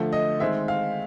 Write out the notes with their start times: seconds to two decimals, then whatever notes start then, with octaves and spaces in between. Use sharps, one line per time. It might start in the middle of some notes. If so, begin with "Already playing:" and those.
Already playing: D3 F3 A3
0.13 D#5
0.40 D#3 G#3 C4 E5
0.68 F5